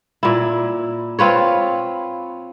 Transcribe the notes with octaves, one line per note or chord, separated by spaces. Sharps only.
A#2 E4
C4 F4 B4 C#5